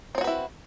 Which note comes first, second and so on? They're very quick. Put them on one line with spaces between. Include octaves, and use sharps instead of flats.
C4 C#5 F#4 B4 E4